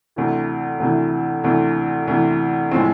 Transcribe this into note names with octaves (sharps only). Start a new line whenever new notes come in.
D2 C3 E3
D2 C3 E3
D2 C3 E3
D2 C3 E3
A2 F3 G#3 C4